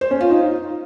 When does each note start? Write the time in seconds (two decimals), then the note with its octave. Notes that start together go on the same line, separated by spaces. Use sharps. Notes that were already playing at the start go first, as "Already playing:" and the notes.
0.01 C5
0.11 C#4
0.21 F4
0.30 D#4